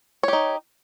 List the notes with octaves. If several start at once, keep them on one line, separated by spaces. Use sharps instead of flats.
D#4 G4 C#5